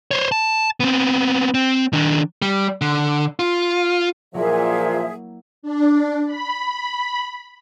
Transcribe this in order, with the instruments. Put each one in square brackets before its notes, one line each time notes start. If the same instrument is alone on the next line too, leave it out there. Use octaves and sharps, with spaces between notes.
[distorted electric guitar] C5 C#5
A5
B3 C4
C4
D#3 D4
[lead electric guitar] G3
D3
F4
[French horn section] A#2 F3 [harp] F#3 A#3 E4 [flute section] G#4 E5
[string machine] D4
B5